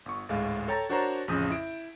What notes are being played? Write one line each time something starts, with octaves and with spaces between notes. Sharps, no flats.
G1 C#6
G#1 D2 A2 G#3 F5
A4 C#5 G5 A#5 A6
D4 F#4 A#4 C5 C#5 A#5
A1 F2 C#3 D#6 G6
E4 D7